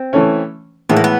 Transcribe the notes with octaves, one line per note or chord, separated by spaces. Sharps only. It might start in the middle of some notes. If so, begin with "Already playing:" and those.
Already playing: C4
E3 A3 C#4
A2 E3 G#3 B3
A#3
B3